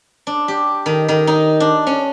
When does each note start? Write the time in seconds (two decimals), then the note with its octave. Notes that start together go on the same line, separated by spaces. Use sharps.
0.27 D4
0.48 G4
0.86 D#3
1.08 D#3
1.27 D#4
1.60 D4
1.87 C#4